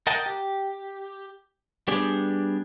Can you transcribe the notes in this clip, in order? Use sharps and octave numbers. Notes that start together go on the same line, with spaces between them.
A#4 D#5 F#5 G5 A5
G4
G3 B3 D4 G4 G#4